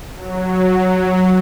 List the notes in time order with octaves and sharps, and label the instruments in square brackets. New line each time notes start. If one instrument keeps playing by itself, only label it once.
[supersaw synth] F#3